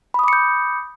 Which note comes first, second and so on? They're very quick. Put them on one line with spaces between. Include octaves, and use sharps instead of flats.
B5 D#6 D6 C#7 G6